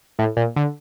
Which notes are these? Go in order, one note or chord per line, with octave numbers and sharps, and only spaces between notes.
A2
A#2
D3